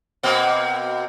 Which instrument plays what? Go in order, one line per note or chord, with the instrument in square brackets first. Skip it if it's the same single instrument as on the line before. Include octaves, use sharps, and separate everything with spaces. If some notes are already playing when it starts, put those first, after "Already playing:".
[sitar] B2 A#3 C4